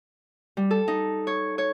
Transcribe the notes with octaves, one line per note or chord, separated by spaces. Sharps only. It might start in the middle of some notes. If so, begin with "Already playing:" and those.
G3
A4
D#4
C#5
C#5